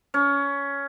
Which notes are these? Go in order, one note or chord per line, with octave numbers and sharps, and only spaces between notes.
C#4